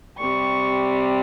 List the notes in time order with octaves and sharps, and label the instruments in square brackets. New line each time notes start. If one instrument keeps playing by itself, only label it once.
[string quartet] C3 G3 C#6